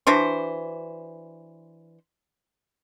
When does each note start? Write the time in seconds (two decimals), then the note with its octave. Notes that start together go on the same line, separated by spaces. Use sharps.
0.07 E3 D4 F#4 C5